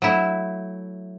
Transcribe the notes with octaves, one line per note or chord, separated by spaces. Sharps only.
F#3 A3 E4